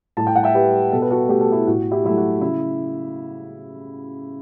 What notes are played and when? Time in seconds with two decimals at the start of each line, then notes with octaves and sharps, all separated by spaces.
0.17 A2 A5
0.27 G5
0.35 F#5
0.43 E5 G5
0.54 G3 G4 B4
0.92 B2 A4
1.02 B4
1.10 F#4 A4
1.29 A3 G4
1.41 A4
1.52 E4 G4
1.67 A2 F#4
1.91 E4 G4
2.04 F#3 A3 E4
2.17 F#4
2.41 C#3 E4